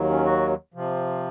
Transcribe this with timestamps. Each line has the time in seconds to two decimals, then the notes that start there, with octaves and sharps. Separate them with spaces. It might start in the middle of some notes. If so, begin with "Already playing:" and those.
Already playing: D#2 D#3 F#3
0.10 C#4
0.25 F#4
0.74 C3 F3